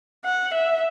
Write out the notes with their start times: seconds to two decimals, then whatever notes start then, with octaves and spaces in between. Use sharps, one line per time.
0.25 F#5
0.54 E5